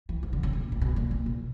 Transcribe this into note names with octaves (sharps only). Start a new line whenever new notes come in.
E3
D#3
D3
C#3
B2
A#2
B2
A#2
A#2
B2